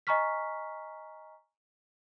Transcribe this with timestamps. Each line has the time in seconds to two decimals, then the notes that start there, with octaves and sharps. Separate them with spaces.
0.07 D#5 G#5 A#5 C#6 F6 B6